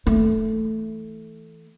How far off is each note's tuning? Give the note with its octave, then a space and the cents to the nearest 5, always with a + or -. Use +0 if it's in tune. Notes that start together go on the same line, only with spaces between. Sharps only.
E3 -15 A3 +0